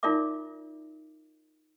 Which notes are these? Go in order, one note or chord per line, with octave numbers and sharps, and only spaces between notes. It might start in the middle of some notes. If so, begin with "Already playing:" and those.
D#4 F4 A#4 D5 E5 D6